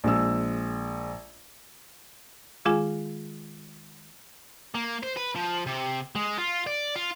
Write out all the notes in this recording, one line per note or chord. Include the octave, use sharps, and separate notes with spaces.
A#1 G#3 E6
D#3 G#3 F4 G#4 G#5
A#3
C5
B4
F3
C3
G#3
F4
D5
F4